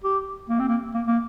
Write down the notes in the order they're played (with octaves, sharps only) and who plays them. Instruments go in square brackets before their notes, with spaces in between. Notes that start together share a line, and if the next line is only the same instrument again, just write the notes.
[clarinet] G4
A#3
C4
A#3
A#3
A#3